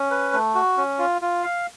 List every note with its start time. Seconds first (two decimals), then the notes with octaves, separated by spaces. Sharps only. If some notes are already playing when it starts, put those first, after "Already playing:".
Already playing: C#4
0.11 B4
0.33 A3
0.55 F#4
0.77 C#4
0.99 F4
1.22 F4
1.43 F5